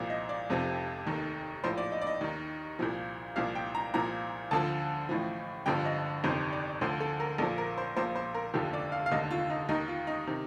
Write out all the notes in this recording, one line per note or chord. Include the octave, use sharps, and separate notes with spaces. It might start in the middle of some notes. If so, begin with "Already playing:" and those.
Already playing: C2 A#2 F3
D#5
D5
F1 F2 C3 F3
F1 D#2 D#3
A#1 A2 F3 C5
D5
D#5
D5
D#5
D#2 D#3
C2 A#2 F3
C2 A#2 F3 F5
G5
A#5
C2 A#2 F3 A#5
D2 D3 F3 A5
A1 A2 F3
G1 G2 D3 F3 G5
D#5
G1 F2 C3 D#3 C5
D5
D2 D3 F3 C5
A4
A#4
A#1 A#2 F3 A4
A#4
C5
A#1 A#2 F3 C5
C5
A#4
F1 D#2 D3 F3 G4
D5
F5
F5
F1 D#2 D3 D#5
F4
D#4
D#2 D#3 D#4
F4
D#4
C3 D#3